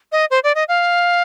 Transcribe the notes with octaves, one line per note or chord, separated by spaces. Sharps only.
D#5
C5
D5
D#5
F5